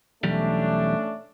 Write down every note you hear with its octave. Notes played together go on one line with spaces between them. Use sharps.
B1 E2 G3 A3 C#4 D4